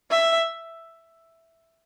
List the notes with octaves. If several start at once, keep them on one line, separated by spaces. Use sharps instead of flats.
E5